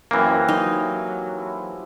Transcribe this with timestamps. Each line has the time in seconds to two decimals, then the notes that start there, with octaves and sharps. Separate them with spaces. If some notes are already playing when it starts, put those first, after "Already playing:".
0.11 F#2 C3 E3 A#3 C4 D6
0.48 F#3 D#4 E4
1.36 F3 E4